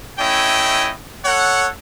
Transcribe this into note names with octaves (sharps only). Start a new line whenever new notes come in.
A3 C#4 E4 D#5 G5
A4 C#5 F#5